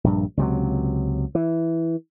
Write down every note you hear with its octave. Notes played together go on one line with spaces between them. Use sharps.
A#1 G2
C#2 C3 F#3
E3